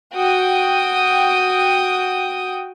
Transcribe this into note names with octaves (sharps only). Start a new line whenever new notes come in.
F#4 G5 D#6